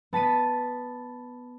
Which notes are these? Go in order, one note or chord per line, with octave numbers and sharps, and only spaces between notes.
B3 A5 B6 D#7